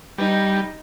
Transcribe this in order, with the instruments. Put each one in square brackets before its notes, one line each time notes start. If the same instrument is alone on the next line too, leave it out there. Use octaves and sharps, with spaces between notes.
[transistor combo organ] G3 [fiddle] D#4